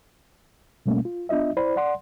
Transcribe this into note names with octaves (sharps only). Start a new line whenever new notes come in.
B2 G3 A3 A#3 C#4
F4
B3 D4 F4 D#5 E5
E4 C5 D5 B5
D5 F#5 C6